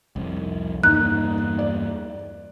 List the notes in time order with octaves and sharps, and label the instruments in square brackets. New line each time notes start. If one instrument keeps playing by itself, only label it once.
[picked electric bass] C2 F2
[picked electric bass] E2 G2 A#3 [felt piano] D#4 [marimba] F#6
[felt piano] D5